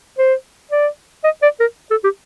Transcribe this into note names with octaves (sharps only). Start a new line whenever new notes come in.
C5
D5
D#5
D5
A#4
A4
G4